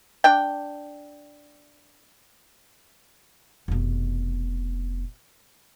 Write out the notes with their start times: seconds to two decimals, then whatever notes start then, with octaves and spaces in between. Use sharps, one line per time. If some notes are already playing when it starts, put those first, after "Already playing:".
0.24 D4 G5
3.68 F1 B2